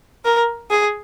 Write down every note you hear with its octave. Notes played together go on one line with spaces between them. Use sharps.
A#4
G#4